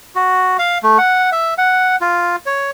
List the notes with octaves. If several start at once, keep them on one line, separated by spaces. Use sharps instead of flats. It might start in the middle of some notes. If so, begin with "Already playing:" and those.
F#4
F5
A3
F#5
E5
F#5
F4
C#5